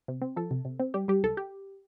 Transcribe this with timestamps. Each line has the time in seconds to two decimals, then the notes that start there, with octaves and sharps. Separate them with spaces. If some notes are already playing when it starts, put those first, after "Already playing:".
0.08 C3
0.22 C4
0.36 F3 A4
0.51 C3
0.65 C3
0.80 C4
0.94 G3 G4
1.08 G3 G4
1.23 C2 A4
1.37 G4